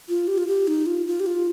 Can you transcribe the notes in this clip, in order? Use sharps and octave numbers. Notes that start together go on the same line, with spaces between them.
F4
G4
F4
G4
D#4
F4
F4
G4
F4